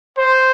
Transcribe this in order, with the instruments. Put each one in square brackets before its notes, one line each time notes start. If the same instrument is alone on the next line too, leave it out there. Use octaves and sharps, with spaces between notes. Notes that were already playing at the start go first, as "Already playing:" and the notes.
[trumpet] C5